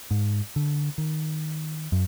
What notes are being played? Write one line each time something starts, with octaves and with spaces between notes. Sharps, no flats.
G#2
D3
D#3
F#2